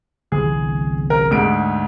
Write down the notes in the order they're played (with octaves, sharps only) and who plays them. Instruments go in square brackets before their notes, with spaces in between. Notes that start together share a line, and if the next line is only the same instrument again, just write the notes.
[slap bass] G1 C2 E3 [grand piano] G#4
[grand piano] A#4
D2 G#2 D7